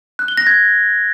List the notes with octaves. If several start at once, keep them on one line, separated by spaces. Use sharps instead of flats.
F#6
G7
A#6
G#6